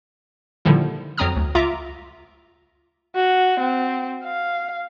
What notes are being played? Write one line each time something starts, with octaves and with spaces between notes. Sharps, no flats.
A#2 D3 D#3 F3 G3 E4
F2 F#3 C4 A#5 D#6 F6
D2
C#2 F4 E5 A#5 D6
F#4
C4
F5